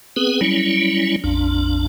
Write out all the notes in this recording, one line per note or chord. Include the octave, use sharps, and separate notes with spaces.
B3 C4 G#4 B4
F#3 G3 C#4 E4
A#1 F2 D4